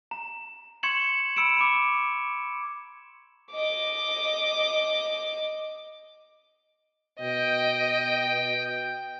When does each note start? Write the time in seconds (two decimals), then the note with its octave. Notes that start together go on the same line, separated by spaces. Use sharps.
0.11 A#5
0.83 C6 C#6 G#6 C#7 E7 F#7
1.36 B5 E6 C#7 D7 E7
1.57 B5 D6
3.53 D#5 D6
7.20 B2 D#5 G5